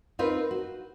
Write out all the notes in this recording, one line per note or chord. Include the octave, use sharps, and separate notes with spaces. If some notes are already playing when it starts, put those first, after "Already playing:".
C4 D#4 F4 A#4 B4
F#4